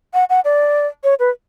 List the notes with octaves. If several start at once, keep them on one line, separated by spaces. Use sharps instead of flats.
F#5
F#5
D5
C#5
B4